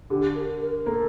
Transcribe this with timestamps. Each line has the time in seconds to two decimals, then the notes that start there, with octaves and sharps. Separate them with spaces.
0.10 D3 G4
0.35 A#4
0.61 A#4
0.85 A#3 A4